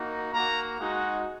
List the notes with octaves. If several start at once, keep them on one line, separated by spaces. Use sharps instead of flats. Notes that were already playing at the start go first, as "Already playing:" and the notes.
Already playing: A#3 D#4 F#4
A#3 F#4 A#5
G#3 D#4 F#4